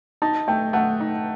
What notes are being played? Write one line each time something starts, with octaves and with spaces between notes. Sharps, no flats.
D#4 A5
A3 G5
A3 F#5
D#4